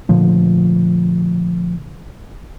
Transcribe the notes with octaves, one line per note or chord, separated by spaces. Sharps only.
A#2 D3 F3 A3